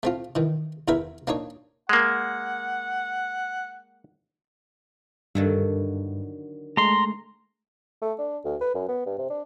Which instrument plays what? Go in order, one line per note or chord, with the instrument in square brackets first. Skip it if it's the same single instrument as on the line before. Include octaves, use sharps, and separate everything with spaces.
[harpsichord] A3 C4 F4
D#3 E3
E2 E3 A#4 B4 E5
A#3 D4 D#4 C#5
[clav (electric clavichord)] G#3 A#3 [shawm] F#5
[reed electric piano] G2 [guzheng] D3 D#3 F#3
[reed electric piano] G#3 A3 [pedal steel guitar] A#5 C6
[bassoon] A3
D4
D2
B4
F#2
B3
G2
C3
D4